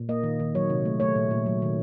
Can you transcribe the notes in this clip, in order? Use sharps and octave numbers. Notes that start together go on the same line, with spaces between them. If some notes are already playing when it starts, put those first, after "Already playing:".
Already playing: A#2
A#3 D#5
D#3
D#3
F#3 C#5
C3
A3
A3 C#5
A#2
A#2
F#3
D#3